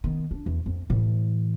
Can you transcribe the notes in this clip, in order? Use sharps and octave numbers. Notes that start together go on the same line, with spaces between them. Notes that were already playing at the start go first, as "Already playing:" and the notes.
D#3 B3
D4
E2
F2
A2 E3